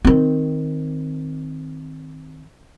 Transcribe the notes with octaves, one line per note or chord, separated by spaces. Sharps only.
D#3 C4